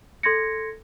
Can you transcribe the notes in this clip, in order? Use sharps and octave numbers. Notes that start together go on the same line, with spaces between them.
A4 C6 G#6 A#6 C#7